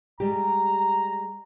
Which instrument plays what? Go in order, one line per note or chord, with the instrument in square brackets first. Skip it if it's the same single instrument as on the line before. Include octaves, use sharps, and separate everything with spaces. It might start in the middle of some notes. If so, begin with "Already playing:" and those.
[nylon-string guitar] G3 G#3 G4 [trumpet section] A#5